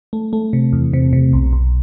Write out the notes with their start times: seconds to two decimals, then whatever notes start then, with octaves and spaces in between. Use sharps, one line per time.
0.13 A3
0.33 A3
0.53 C3
0.72 E2
0.93 C3
1.13 C3
1.33 B1
1.53 B1